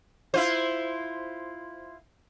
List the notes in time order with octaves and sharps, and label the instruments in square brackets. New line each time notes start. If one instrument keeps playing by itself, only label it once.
[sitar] E4 F4 C5